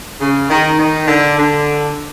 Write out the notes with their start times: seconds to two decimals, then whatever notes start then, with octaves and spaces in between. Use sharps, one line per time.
0.20 C#3
0.49 D#3
0.78 D#3
1.07 D3
1.37 D3